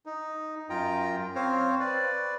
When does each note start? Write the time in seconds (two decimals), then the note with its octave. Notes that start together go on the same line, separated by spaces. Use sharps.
0.06 D#4
0.70 F#2 F4 G5 A#5
1.35 C4 C5 C#5 F5
1.80 B4 D5